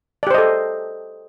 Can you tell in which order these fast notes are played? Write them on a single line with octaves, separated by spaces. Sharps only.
D5 G4 C5 D#5 A4